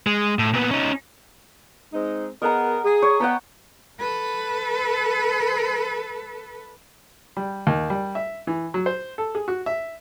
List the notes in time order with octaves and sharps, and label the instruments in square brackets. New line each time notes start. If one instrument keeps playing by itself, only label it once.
[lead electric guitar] G#3
A2
A#2 B3
C#4 D#4
[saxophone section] G#3 C4 D#4
[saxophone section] B3 G#4 A#4 [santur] D#5 F#5 A#5
[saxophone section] G#4
[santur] C#5
[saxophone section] B3 [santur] F#5 G5 A#5
[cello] A4 B4
[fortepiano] G3
D#2
G3
E5
E3
F#3
C5
A4
G#4
F#4
E5